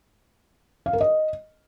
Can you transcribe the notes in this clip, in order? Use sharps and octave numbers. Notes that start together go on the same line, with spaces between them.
F5
A#4
D#5